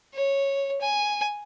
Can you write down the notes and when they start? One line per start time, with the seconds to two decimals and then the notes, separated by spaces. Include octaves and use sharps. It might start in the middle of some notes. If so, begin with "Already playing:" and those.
0.14 C#5
0.81 G#5